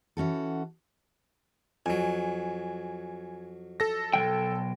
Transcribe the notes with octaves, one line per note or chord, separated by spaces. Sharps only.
E3 C#4 F#4 A4
F2 F#3 G#5
A4 A#6
B1 C#3 G5